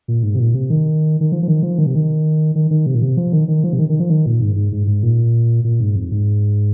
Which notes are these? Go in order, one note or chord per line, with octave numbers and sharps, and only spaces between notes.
A#2
G#2
C3
A#2
C3
D#3
D#3
F3
F3
D#3
F3
D#3
C3
D#3
D#3
D#3
C3
A#2
C3
F3
D#3
D#3
F3
C3
D#3
D#3
F3
D#3
A#2
G#2
G#2
G#2
G#2
A#2
A#2
G#2
F2
G#2